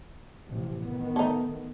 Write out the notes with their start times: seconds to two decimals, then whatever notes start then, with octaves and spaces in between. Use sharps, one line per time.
0.47 A1 C3 F3
0.84 D#3 B3
1.16 A3 D#4